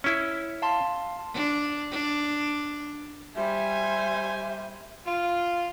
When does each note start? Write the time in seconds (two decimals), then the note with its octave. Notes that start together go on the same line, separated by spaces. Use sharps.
0.04 C#4 E4
0.62 F5 A5 C6
1.33 D4
1.91 D4
3.36 G3 C5 E5 G#5
5.06 F4